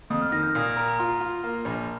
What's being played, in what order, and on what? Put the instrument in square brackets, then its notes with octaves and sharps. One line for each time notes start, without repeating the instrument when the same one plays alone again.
[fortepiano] F2 [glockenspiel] D#6
[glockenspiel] F6
[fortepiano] D#3 [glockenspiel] F6 A#6
[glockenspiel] G6
[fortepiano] A#2 [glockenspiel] D#6
[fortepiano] A#4
[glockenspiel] A#5
[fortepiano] F4 [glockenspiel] C6
[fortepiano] F4
A#3
A#1